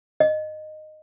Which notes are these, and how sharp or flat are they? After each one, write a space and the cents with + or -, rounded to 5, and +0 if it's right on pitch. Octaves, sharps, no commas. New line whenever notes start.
D#5 -15